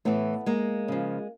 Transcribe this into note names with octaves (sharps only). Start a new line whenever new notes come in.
A2 E3 A3 B3
G#3 A#3
C#3 F3